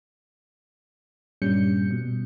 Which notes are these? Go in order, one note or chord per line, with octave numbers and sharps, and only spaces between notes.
G2 A#2 G3 C#4 G6 C#7
B2